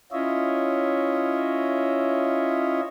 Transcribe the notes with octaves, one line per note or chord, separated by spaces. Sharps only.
C#4 E4 F4 C#5 D#5 E5